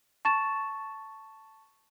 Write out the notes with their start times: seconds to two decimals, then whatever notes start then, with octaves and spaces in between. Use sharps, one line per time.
0.25 A5 C#6 A6 E7